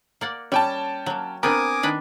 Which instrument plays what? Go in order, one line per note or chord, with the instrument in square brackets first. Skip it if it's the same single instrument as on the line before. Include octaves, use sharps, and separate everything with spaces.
[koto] A#3 D5 F#5
[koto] G3 [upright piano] C#4 G5 A5
[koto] F#3 A#3
[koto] B3 C4 D4 [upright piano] A#4 [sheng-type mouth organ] G#5 D6 D#6
[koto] D#3 D4 B4